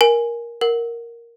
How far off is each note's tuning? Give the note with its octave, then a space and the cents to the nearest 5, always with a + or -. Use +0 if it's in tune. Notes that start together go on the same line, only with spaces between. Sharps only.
A#4 +15 G#5 +0
A#4 +0 F#5 +0